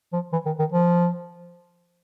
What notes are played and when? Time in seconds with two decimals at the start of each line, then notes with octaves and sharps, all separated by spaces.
0.13 F3
0.33 E3
0.46 D#3
0.59 D#3
0.72 F3